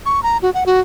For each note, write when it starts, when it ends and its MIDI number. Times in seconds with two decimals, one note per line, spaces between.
0.06 0.20 85
0.23 0.37 82
0.42 0.50 66
0.54 0.64 78
0.66 0.80 66